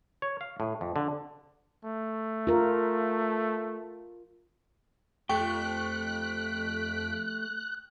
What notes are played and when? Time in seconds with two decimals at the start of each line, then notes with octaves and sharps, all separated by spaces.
0.22 C#5
0.41 F5
0.60 A2
0.81 F2
0.96 D3
1.85 A3
2.47 F4 A#4
5.29 F2 A3 G4 G5 C#6 F#6 B6 D7